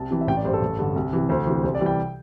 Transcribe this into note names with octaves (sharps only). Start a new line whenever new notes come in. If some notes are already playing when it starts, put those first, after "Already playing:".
Already playing: C2 A5
C3 E3
E5
A1 G5
D5
G2 G3 C5
A4
A1
G2 D3
C2
C3 E3
D2 C5
C3 E3
C2 C5
D5
C3 E3 G3
G5